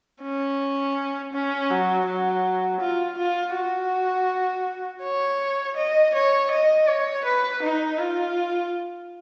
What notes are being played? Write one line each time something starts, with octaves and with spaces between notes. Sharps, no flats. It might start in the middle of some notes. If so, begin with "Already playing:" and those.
C#4
C#4
F#3
F#3
F4
F4
F#4
C#5
D#5
C#5
D#5
C#5
B4
D#4
F4